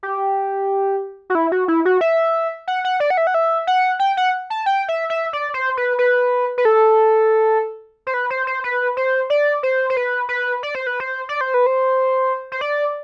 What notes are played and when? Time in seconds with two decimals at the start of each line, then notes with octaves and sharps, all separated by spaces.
0.03 G4
1.30 F#4
1.35 E4
1.52 F#4
1.68 E4
1.85 F#4
2.01 E5
2.67 F#5
2.85 F#5
3.00 D5
3.10 F#5
3.17 E5
3.27 F#5
3.34 E5
3.67 F#5
3.99 G5
4.17 F#5
4.50 A5
4.66 G5
4.88 E5
5.10 E5
5.33 D5
5.54 C5
5.77 B4
5.99 B4
6.58 B4
6.65 A4
8.07 C5
8.14 B4
8.30 C5
8.47 C5
8.64 B4
8.97 C5
9.30 D5
9.63 C5
9.90 C5
9.97 B4
10.29 B4
10.63 D5
10.75 C5
10.87 B4
11.00 C5
11.29 D5
11.41 C5
11.54 B4
11.66 C5
12.52 C5
12.61 D5